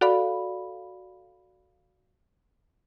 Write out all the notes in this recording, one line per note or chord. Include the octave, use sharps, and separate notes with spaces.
F#4 A4 D5 F5 B5